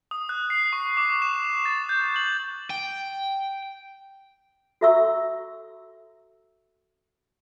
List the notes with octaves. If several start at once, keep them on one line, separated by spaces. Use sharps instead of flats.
D#6
F#6
C7
C#6
D6
E7
A6
G6
F#7
G5
F#4 A4 E5 A#5 C#6 E6